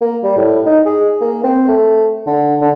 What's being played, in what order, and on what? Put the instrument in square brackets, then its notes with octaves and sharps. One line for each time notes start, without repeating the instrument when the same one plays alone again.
[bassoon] A#3
G3
A2
D#4
G#4
A#3
C4
A3
D3
D3